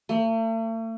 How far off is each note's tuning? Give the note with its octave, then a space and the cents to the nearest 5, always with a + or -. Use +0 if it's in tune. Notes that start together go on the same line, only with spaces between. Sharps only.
A3 +45